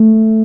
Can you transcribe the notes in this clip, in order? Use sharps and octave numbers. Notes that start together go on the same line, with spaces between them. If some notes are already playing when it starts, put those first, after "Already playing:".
Already playing: A3